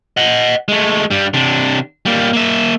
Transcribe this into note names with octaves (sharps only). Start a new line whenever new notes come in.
D#5 F#5
G#3 A3
G2 G3
C3 D4
G3 A#3
A#3 E5